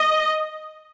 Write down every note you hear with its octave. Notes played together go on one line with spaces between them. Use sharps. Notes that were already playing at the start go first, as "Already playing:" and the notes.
Already playing: D#5